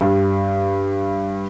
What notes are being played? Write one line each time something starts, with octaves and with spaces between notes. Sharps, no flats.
G2